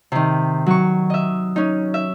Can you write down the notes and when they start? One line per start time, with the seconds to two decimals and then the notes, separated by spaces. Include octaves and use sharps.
0.12 C3 D#3
0.66 F#3 C#6
1.10 D#5 E5
1.56 C#4 D#4
1.94 E5